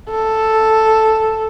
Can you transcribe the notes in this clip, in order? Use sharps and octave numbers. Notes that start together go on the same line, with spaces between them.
A4